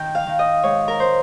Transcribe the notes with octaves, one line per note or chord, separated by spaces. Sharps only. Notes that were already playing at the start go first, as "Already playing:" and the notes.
Already playing: D#3 G5
F5
D#3
D#5
G#2 C#5
A#4
C5